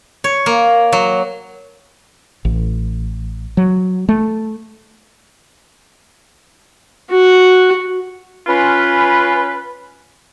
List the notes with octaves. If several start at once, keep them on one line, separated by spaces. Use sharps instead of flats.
C#5
A#3
F#3
A1
F#3
A3
F#4
C#4 F4 B4